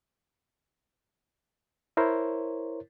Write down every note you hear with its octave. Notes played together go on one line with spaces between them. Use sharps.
E4 A#4 C5 C#5